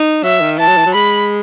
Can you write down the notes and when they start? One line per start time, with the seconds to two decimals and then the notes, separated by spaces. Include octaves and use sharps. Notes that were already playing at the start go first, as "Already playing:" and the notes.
Already playing: D#4
0.23 F#3 E5
0.41 D#3
0.58 E3 A5
0.68 F#3
0.77 E3
0.85 F#3
0.94 G#3 B5